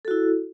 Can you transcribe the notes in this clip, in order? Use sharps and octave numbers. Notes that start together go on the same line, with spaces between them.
E4 F#4 A4